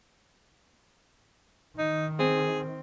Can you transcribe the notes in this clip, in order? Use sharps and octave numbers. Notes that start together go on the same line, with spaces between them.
D#3 D#4
C4 G#4